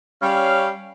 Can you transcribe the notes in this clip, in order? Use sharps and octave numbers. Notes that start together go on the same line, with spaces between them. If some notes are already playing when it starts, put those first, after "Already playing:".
G3 C#4 F5